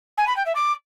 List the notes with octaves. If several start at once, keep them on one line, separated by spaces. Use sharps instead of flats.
G#5
B5
G5
E5
D6